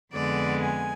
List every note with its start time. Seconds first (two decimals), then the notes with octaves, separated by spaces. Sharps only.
0.13 F2 D3 G#3 B3 D5
0.62 G#5